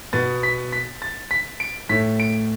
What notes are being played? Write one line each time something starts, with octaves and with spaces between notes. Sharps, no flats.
B2 B3 A6
B6
B6
A6
B6
D7
A2 A3 B6
D7